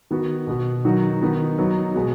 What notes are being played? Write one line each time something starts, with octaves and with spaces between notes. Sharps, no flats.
D#3 B3 F#4
B2 B3 F#4
D#3 F#3 D#4 F#4
D#3 B3 D#4
F#3 B3 D#4 F#4
B2 G#3 B3 F#4